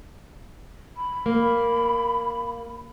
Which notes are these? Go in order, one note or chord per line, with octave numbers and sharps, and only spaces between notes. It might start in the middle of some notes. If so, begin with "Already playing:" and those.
B5
A#3